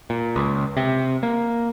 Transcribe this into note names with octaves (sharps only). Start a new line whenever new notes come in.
A#2
C#2
C3
A#3